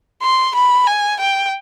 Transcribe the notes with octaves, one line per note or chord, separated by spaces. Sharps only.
C6
B5
G#5
G5